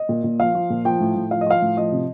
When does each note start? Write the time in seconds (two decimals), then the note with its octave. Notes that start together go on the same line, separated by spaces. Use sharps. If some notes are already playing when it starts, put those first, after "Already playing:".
Already playing: D#5
0.09 A#2
0.24 A#2
0.40 F3 F5
0.55 F3
0.70 A#2
0.85 F3 G5
1.01 A2
1.16 A2
1.31 F3 F5
1.41 D#5
1.46 F3 F5
1.62 A2
1.77 F3 D#5
1.92 C3